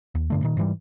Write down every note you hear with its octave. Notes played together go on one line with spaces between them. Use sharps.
D#2
G2 D3 A3
A#2 D#3
G#2 E3 G3